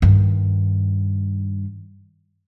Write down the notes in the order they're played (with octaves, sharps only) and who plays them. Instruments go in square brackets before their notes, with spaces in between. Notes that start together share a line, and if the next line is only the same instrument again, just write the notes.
[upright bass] G2 D#3